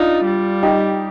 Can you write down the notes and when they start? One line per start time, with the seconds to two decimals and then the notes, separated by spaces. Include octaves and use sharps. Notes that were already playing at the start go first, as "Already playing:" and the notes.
Already playing: D4 D#4 F4
0.25 G3
0.63 D#4 G4